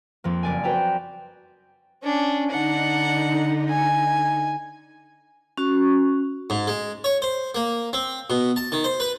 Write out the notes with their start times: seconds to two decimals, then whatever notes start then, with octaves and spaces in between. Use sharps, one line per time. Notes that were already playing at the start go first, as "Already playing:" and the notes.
0.24 F2 F3 A#3
0.43 F#1 D5 G#5
0.63 F#4 B4 C5 G5 A#5 D6
2.03 C#4 D4
2.50 D3 D4 D#4 F#5
3.70 G#5
5.57 C#4 F#4 C#6
6.50 G#2
6.67 G#3
7.04 C#5
7.22 C5
7.55 A#3
7.93 C4
8.30 B2
8.56 A5
8.72 D#3
8.84 C5
9.00 B4